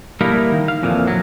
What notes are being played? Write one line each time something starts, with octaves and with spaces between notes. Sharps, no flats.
G3 A3 A#3 D#4 E4 A#4
D#3
F5
F2 A#2 E3 F3
F#3